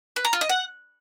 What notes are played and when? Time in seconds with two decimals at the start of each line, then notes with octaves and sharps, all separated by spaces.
0.16 B4
0.25 A#5
0.33 F4
0.41 D#5
0.49 F#5